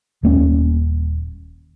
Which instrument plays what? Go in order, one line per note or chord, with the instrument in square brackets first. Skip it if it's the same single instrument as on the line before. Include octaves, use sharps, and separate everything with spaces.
[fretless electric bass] D#1 A#3 C#4